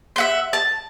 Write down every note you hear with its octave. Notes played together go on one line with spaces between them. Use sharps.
E5 F#5 C6
A5